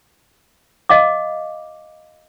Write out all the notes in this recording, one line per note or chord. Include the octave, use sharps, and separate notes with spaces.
D#5 F5 D6